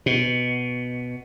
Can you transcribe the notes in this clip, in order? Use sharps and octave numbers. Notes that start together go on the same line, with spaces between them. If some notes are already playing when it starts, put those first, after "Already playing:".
B2